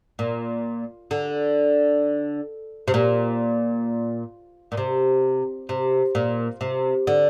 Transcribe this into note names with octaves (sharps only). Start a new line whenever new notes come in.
A#2
D3
C3
A#2
A#2
C3
C3
A#2
C3
D3